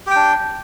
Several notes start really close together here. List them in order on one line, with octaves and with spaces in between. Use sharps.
G4 G5 D4